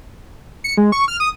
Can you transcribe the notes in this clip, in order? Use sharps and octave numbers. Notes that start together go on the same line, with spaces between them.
C#7
G#3
C#6
F6
D#6